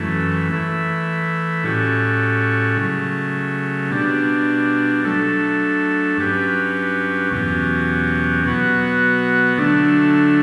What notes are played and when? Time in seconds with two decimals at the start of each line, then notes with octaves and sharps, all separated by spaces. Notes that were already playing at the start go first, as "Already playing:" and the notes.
Already playing: F#2 E3 A3
0.51 E3 A3 E4
1.64 A2 G3 C#4 F#4 A4
2.77 C#3 F#3 A3
3.91 B2 G3 D4
5.04 F#3 A3 D4 A4
6.17 G2 F#3 C#4 G4 B4
7.31 E2 B2 F#3 C#4 G4
8.44 B2 F#3 B3 F#4
9.57 D3 F#3 A3 D4